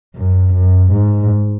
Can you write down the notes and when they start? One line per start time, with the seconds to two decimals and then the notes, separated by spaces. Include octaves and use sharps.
0.16 F#2
0.54 F#2
0.92 G#2